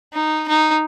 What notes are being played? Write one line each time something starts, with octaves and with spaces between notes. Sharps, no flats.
D#4
D#4